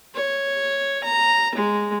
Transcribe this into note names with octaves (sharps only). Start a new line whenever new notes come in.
C#5
A#5
G#3